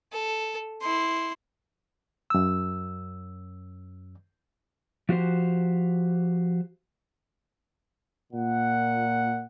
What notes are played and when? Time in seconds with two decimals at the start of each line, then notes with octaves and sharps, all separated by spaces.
0.12 A4
0.82 E4 C6
2.30 F#2 E6
5.09 F3 F#4 G4 C5
8.33 A#2 F#5